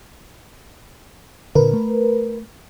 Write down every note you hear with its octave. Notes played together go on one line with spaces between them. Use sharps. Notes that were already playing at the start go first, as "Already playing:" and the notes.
A#2 D3 A#4 B4
A3